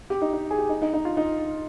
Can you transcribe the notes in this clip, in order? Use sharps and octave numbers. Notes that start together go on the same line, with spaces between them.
G4
D#4
D#4
G#4
G4
D#4
D#4
D#4
F4
D#4